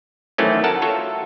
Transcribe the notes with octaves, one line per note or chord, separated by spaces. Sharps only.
D#3 E3 F#3 A3 C4 C#4
A4 A#4 F#5 A5
F4 F#4 A4 C#5 E5